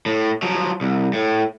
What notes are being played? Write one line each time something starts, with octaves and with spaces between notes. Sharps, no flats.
A2
F3 F#3
C2
A2